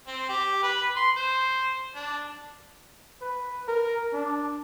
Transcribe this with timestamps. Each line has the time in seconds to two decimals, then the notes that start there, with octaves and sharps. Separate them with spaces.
0.07 C4
0.29 G4
0.63 B4
0.96 C6
1.17 C5
1.95 D4
3.21 B4
3.68 A#4
4.13 D4